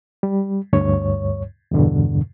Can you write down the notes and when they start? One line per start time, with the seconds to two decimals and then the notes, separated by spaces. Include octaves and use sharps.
0.23 G3
0.73 D2 G2 C#5
1.71 E2 G2 B2 D3